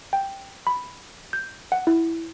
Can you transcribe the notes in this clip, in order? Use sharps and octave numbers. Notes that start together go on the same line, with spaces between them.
G5
B5
G6
F#5
E4